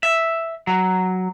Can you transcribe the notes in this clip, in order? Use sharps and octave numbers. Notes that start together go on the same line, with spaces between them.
E5
F#3